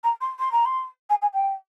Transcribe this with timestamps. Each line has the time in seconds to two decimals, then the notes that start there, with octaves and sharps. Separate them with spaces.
0.04 A#5
0.21 C6
0.39 C6
0.52 A#5
0.65 C6
1.09 G#5
1.22 G#5
1.33 G5